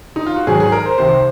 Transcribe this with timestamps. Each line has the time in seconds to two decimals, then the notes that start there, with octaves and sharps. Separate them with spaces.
0.16 D#4
0.26 F4
0.36 F#4
0.47 G#2 D#3 F#3 G#4
0.60 G#4
0.72 A#4
0.86 C5
0.98 C2 C3 D#3 C5